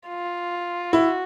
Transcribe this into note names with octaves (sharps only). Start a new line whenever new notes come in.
F4
E4 F#4